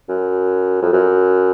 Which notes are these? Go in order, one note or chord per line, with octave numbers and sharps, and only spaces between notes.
F#2
F2
F#2